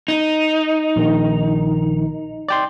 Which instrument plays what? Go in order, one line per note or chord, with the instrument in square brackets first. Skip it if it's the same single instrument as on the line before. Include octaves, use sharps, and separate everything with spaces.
[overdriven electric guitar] D#4
[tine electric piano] A#1 D#3
D5 G5 C6